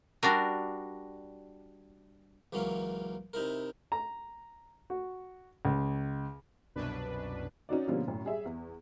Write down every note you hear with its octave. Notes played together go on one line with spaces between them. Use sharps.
G3 D4 F#4 A#4
C#2 E3 F#3 A#3 C#4
C3 D#4 E4 A#4
A#5
F#4
C#2
C2 F#2 B2 D4 B4
C#4 D#4 F#4 D5
B2 D3 F3 G3 A#3 C#4
F#2 A2
G3 G#4 E5
E2